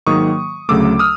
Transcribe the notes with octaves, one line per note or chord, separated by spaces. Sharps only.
G#2 D#3 F#3 A#3 C#6 D#6
D2 C#3 F#3 A3 D6 E6
D#6 F6